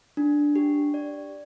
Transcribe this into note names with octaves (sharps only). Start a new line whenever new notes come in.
D4
G4
D5